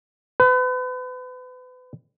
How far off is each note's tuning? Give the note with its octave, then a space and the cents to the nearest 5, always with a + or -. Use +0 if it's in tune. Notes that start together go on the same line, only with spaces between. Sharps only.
B4 +35